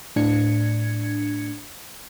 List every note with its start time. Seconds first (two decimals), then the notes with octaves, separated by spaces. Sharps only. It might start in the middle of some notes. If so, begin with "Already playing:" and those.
0.16 A2 D4 G#6 C#7